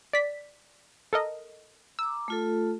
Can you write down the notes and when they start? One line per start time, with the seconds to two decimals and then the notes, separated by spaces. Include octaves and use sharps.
0.13 D5 B6
1.13 A4 A#4 D#5
1.99 A#5 D6 E6
2.28 A3 F4 A4